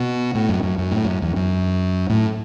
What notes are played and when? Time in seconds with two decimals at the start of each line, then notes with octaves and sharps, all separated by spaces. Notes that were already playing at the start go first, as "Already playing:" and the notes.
Already playing: B2
0.35 A2
0.49 F#2
0.63 F#2
0.78 F#2
0.92 A2
1.05 F#2
1.22 E2
1.36 F#2
2.10 A2